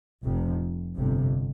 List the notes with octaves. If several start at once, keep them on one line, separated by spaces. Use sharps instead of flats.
F1 F2 C3
G1 F2 C3